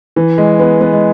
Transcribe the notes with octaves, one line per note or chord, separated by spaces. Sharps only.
E3
G#3
B3
B3
G#3